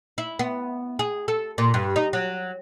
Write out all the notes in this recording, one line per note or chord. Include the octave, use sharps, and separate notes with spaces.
E4
B3
G#4
A4
A#2
G2
D#4
F#3